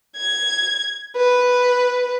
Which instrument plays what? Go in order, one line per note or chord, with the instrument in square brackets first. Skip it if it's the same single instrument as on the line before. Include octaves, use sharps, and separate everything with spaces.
[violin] G#6
B4